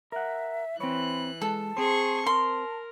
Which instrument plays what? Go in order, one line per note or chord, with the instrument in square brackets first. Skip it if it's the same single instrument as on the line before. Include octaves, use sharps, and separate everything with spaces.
[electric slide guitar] A#4 F#5 [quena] E5
[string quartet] E3 F#6 [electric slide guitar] C4 C#5 [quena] B5
[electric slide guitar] G#3 [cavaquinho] A4 [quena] A5
[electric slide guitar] C4 C5 [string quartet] G#4 C6 C#6
[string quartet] A#4 [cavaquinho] C6